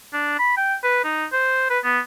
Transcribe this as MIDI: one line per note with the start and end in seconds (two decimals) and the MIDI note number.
0.14 0.35 62
0.39 0.54 83
0.57 0.75 79
0.83 1.02 71
1.04 1.25 63
1.33 1.68 72
1.70 1.79 71
1.84 2.00 59